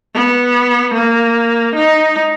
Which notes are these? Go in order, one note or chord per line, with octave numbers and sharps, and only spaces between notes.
B3
A#3
D#4